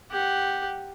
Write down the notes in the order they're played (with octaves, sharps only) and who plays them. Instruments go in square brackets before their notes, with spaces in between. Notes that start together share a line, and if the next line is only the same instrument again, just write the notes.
[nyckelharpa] G4 F#5